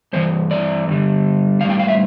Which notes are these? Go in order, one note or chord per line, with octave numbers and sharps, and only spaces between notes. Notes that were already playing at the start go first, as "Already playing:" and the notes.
G2 E3 C5
D5
G2 D3 G3
A2 G3 F5
G5
F5
E5